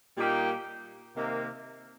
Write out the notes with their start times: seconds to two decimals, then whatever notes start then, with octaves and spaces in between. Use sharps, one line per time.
0.17 A#2 G3 A#3 D#4 G4
1.14 C3 D#3 A#3